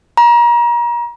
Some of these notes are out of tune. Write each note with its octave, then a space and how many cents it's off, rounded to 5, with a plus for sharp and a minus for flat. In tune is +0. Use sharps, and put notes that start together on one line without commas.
A#5 +35